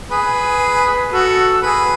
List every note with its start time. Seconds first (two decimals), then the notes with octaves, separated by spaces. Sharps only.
0.11 G#4 B4
1.12 F#4 A4
1.62 G#4 B4